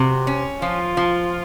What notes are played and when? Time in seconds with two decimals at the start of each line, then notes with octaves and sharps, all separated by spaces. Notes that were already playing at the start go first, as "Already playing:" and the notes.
Already playing: C3 F#4
0.27 C#4
0.62 F3 F4
0.97 F3